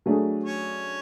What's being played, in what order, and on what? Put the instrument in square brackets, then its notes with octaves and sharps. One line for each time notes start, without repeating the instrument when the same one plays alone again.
[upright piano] F#3 A3 D4 G#4
[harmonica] C#4 C#5